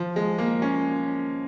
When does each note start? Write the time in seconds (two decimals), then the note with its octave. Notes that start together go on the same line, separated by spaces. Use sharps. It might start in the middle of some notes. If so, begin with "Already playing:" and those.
Already playing: F3
0.16 G#3
0.38 A#3
0.62 C#4